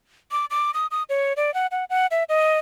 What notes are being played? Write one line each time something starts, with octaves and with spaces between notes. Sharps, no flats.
D6
D6
D#6
D#6
C#5
D5
F#5
F#5
F#5
E5
D#5